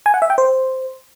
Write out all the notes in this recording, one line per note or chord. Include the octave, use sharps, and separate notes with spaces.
G#5
F#5
E5
G5
C5